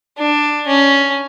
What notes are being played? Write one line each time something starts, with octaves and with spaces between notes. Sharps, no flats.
D4
C#4